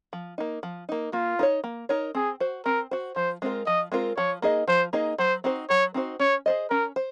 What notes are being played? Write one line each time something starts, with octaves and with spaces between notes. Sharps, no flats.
F3
A#3 D#4
F3
A#3 D#4
A#3 F4
D#4 A#4 C#5
A#3
D#4 A#4 C#5
C4 G#4
F#4 C5
C4 A#4
F#4 C5
F3 C5
G#3 C4 F4 A#4
F3 D#5
G#3 C4 F4 A#4
F3 C#5
A#3 D#4 G#4 D#5
F3 C5
A#3 D#4 G#4 D#5
F#3 C5
C4 D#4 F#4 C5
F#3 C#5
C4 D#4 F#4 C5
C#4 C#5
G#4 C5 D#5
C#4 A#4
C5